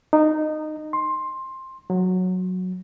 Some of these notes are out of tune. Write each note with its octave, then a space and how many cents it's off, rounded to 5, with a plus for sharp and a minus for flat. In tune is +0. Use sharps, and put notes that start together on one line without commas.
D#4 -15
C6 +15
F#3 -10